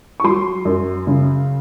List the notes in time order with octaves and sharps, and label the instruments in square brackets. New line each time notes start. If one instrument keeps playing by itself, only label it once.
[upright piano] C#6
F#3 C6
F#2
C#3